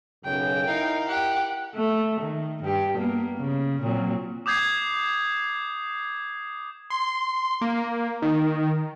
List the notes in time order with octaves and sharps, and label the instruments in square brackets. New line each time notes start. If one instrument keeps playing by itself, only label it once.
[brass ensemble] B1 F#2 C#3 [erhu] G5
[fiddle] D#4 F5 [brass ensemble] E4 A#4
[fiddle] G4 [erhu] F#5
[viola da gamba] A3
D#3
G2 G4
A#3 B3
C#3
A#2 F#3 C4
[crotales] D6 D#6 G6 G#6 C7
[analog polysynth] C6
A#3
D#3